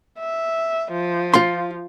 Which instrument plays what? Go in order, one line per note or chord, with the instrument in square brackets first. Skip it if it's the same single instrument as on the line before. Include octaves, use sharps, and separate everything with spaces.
[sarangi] E5
F3
[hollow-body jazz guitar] F4 C6